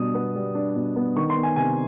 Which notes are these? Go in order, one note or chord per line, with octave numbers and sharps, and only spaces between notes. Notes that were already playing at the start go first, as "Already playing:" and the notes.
Already playing: B2 G3 D4 D#6
B3
G3
D4
B2
B3
D#3 C#6
C6
B3
G#5
C3 G#5